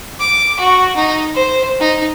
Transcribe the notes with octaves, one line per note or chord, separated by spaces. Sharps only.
D6
F#4
D#4
C5
D#4